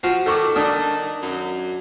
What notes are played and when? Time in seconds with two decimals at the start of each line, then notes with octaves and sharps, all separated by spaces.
0.03 F3 F#4
0.26 D#3 A4 C#6 D6
0.56 D#3 D4 D#6
1.22 F#2